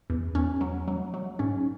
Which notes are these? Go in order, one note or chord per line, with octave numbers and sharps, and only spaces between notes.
E2
E2 C#4
F#3
F#3
F#3
G#2 C#4